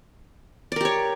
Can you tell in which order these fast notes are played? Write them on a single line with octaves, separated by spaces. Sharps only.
D5 A#4 G4 C#5